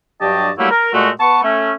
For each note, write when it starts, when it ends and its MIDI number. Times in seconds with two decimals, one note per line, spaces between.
0.21 0.50 43
0.21 0.50 54
0.21 0.50 62
0.21 0.50 67
0.21 0.50 75
0.21 0.50 81
0.58 0.71 54
0.58 0.71 55
0.58 0.71 57
0.58 0.71 58
0.58 0.71 64
0.58 0.71 67
0.71 0.89 70
0.93 1.09 46
0.93 1.09 56
0.93 1.09 57
0.93 1.09 66
1.20 1.42 59
1.20 1.42 71
1.20 1.42 81
1.20 1.42 85
1.43 1.72 57
1.43 1.72 61